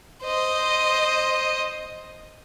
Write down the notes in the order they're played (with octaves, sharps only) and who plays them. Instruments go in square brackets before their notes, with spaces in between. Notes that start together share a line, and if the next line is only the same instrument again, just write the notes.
[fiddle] C5 D#5